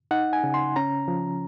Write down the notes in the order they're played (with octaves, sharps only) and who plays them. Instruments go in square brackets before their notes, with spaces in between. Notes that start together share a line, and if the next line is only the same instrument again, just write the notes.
[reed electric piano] D#4 F#5
G#5
C#3
C6
C#4 A#5
F3